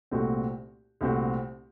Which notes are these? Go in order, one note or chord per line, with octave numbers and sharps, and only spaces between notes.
C2 A#2 A3 C4 F#4
C2 A#2 A3 C4 F#4